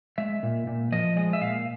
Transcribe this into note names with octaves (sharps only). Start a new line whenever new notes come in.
G#3 E5
A#2
A#2
F3 D#5
G#3 D#5
E5
A#2 F5